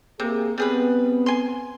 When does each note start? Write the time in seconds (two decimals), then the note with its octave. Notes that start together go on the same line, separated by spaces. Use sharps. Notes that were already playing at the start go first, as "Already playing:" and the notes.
0.20 C3 A#3 G#4
0.58 G3 B3 C4 G#4 B4
1.26 G#5 C6